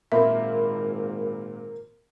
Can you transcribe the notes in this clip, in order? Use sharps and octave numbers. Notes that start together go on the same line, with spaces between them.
G#1 A#2 A#3 C4 E5 B5